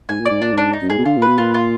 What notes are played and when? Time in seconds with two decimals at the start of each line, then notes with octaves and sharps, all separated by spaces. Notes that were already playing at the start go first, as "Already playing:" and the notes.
0.09 G#2 G#5
0.20 A#2
0.25 D5
0.30 G#2
0.41 A#2 D4
0.53 G#2 D4
0.73 D#4
0.82 F#2
0.90 G#2 G#4
0.98 B2
1.05 D3 F4
1.17 A#2
1.22 B2 B4
1.38 A#2 F4
1.54 F4